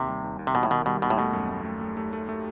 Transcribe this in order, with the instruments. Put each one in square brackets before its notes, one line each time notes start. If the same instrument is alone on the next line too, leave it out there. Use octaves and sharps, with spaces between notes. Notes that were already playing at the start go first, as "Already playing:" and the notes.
Already playing: [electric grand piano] D#2 [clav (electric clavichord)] C3
[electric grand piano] G3
D#2
D#2
[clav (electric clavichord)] C3
[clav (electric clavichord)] B2 [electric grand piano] D#3
[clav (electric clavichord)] A2
[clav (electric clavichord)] B2 [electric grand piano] D#3
[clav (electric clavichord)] B2 [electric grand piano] G3
[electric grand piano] D#2 [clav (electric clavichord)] B2
[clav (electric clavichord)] A2
[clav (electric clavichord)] B2 [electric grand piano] A3
[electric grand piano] F#2
A3
A3
A3
A3
A3
A3